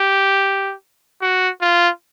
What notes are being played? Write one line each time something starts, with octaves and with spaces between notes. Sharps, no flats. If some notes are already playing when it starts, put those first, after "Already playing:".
Already playing: G4
F#4
F4